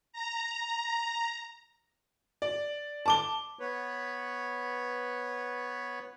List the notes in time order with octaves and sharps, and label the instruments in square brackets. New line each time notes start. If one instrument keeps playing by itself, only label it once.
[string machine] A#5
[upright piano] D5
A5 D6 G7
[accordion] B3 B4 C#5